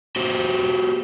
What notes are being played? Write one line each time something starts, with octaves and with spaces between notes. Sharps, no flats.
F#4 G4 C5